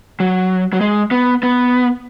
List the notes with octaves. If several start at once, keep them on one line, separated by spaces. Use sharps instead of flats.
F#3
F#3
G#3
B3
B3